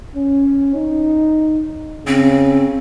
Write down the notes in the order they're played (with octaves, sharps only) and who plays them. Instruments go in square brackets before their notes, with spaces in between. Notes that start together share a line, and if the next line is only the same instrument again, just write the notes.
[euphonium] C#4
D#4
[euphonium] C#3 [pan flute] C4